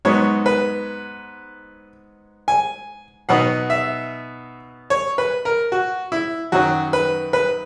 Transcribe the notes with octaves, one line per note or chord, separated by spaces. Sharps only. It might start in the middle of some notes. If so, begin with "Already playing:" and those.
G#2 F#3 B3 D#4 C#5
B4
G#5
B2 F#3 B3 D#4 F#5
E5
C#5
B4
A#4
F#4
E4
F#2 D#3 F#3 C#4 F#4
B4
B4